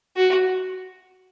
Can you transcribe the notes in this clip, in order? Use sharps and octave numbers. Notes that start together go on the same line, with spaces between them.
F#4